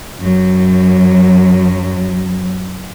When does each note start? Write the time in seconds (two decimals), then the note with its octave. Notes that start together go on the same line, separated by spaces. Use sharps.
0.20 F#2 F#3